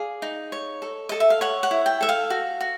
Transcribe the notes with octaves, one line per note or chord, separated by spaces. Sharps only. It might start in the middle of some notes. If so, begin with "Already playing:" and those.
Already playing: G#4 D5 F5
D#4
C#5
A4
A4 D#5
E5
F5
C#5 F#5
F#5
E4
G5
A4 E5
F5
F#4
F#4